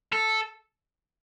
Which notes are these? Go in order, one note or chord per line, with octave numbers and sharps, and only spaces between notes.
A4